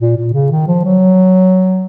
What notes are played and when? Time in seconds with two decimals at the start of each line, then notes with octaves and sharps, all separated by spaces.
0.01 A#2
0.17 A#2
0.33 C#3
0.51 D#3
0.67 F3
0.84 F#3